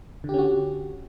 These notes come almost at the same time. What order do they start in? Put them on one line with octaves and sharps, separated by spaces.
D3 G4 C#4 F#4